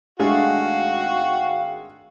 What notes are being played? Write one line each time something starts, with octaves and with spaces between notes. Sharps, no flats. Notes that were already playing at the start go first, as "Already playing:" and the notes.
G#1 G#3 A3 D4 F#4 F5 G5